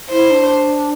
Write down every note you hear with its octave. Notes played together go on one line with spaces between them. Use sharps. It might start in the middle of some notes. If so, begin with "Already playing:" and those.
E4 C5
D4